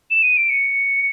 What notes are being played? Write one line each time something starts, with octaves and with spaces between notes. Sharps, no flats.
E7
D#7
D7
C#7